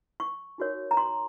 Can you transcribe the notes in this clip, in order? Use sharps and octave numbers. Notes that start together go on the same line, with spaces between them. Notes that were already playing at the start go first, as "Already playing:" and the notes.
C#6
D#4 F#4 A#4 C#5
A#5
C6